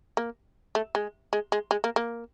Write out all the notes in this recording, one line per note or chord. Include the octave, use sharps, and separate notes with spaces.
A#3
A3
G#3
G#3
G#3
G#3
A#3
A#3